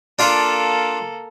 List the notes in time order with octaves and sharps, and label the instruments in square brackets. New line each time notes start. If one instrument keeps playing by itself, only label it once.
[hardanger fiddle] A#3 A4 [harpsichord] D4 F4 D5